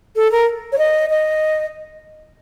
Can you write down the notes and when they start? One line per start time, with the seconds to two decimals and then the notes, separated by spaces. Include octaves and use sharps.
0.16 A4
0.32 A#4
0.72 C#5
0.79 D#5
1.10 D#5